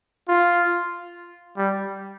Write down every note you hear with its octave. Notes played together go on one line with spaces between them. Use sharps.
F4
G3